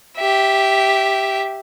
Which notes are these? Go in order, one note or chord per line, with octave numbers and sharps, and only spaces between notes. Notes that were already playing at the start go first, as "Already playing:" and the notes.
G4 E5